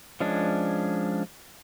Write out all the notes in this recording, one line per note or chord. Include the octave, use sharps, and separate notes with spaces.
F3 G#3 C#4 D4